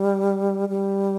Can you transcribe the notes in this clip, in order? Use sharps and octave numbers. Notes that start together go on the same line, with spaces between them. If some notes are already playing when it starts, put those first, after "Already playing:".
Already playing: G3
G3